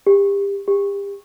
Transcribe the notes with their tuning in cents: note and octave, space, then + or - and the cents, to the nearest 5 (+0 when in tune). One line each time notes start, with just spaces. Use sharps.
G4 +30
G4 +35